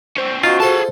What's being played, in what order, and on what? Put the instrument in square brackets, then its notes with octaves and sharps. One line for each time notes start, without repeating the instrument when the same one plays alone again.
[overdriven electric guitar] C#4 C5
[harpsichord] D#4 [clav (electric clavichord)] F4 [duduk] F#4
[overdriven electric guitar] G#4 A5 [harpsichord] A4 C5